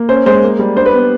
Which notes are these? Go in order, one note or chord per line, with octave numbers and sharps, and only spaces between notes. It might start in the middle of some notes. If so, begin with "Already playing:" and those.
Already playing: A#3
C#4 C5
G#3 C5
A#3
G3
D4 C5
B4
B3